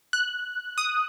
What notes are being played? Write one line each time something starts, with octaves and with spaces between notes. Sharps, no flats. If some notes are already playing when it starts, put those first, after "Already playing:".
F#6
D#6